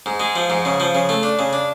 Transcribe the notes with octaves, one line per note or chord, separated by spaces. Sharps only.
G#2
G#3
F3
G#2
C#3
F3
C#3
A3
D4
C#3
D4